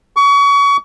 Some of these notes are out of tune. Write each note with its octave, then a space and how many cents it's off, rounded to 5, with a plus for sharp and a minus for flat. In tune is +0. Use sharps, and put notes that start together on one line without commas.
C#6 +30